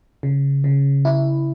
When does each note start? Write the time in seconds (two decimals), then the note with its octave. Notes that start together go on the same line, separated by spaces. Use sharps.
0.23 C#3
0.64 C#3
1.05 E4